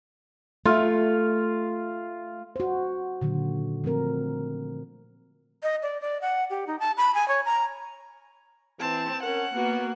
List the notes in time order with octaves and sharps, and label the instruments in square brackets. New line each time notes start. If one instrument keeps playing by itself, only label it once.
[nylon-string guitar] A3 [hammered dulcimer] F4
[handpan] F#4 C5
A#2 D3 D#3 F#3
F3 A3 C4 A#4
[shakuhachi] D#5
D5
D5
F#5
G4
D#4
A5
B5
G#5
C#5
A#5
[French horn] E3 [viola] C4 [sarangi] A5
[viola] C#4 [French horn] A#4 [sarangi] F#5
[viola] A#3 F#4 [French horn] B3